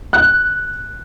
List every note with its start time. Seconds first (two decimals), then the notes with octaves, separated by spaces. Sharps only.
0.13 F#6